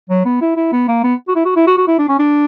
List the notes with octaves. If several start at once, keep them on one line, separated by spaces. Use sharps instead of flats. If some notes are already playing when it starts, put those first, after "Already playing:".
F#3
B3
E4
E4
B3
A#3
B3
F#4
E4
F#4
E4
F#4
F#4
E4
D4
C#4
D4